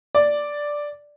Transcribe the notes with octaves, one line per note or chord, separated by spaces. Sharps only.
D5